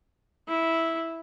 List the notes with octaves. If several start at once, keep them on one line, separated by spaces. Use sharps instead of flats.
E4